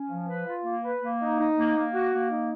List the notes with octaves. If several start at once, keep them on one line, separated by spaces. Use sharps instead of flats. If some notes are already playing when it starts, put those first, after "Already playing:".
Already playing: C#4
F3
B4
F4
A#3
B4
A#3
D#4
D#4
A#3
A#3
F#4
A#3
D#4